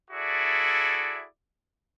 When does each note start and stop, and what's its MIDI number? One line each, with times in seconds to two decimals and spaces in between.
0.11 1.24 64
0.11 1.24 66
0.11 1.24 68
0.11 1.24 69
0.11 1.24 74
0.11 1.24 76